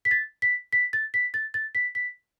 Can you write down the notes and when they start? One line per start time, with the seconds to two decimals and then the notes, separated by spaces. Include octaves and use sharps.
0.05 B6
0.11 A6
0.42 B6
0.73 B6
0.93 A6
1.14 B6
1.34 A6
1.54 A6
1.75 B6
1.95 B6